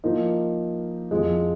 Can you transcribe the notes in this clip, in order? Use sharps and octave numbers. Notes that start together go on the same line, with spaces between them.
F3 A#3 D#4
F2 F3 G#3